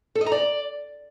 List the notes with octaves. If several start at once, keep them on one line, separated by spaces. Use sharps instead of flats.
A4
D#5
A#5
D5